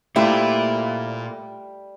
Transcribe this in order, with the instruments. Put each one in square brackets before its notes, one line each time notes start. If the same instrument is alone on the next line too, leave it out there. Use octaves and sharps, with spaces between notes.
[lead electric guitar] A#2 F4 [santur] G3 [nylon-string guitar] A3 [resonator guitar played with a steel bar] E4 C5